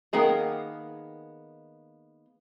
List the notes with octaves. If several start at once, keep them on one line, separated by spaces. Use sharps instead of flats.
D#3 A#3 B3 G#4 A#4